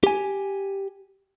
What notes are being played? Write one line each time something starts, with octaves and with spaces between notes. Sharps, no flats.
G4 G#5